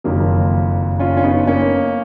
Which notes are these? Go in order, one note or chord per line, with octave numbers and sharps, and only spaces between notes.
F#1 F2 D#3 F#3 A#3
C#4 F4
C#4
B3 D#4
A#3 C#4